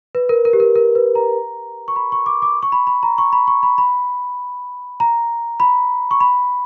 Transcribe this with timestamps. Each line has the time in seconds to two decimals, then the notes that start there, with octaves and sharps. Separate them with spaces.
0.15 B4
0.29 A#4
0.45 A#4
0.53 G4
0.60 A#4
0.75 A#4
0.95 B4
1.15 A#5
1.88 C#6
1.96 B5
2.12 C#6
2.26 D6
2.42 D6
2.63 C#6
2.72 B5
2.87 B5
3.03 A#5
3.18 C#6
3.33 B5
3.48 C#6
3.63 B5
3.78 B5
5.00 A#5
5.60 B5
6.11 C#6
6.21 B5